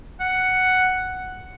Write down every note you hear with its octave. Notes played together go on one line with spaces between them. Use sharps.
F#5